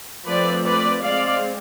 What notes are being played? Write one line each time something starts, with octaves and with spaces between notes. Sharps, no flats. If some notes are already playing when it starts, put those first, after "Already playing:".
F3 A3 C4 B4 D5
B4 D5
G#3 C4 D5 F5